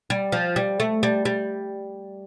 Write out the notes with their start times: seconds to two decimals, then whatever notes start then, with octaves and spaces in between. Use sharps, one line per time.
0.10 G3
0.32 F3
0.56 G3
0.80 A3
1.03 G3
1.25 G3